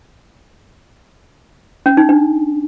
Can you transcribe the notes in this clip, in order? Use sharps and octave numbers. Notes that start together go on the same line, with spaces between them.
C#4
D#4
D4